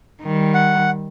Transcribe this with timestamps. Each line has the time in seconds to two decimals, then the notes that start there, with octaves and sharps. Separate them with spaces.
0.22 D#3 G3
0.54 F#5